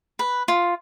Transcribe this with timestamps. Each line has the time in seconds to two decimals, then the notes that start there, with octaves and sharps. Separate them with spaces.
0.19 B4
0.48 F4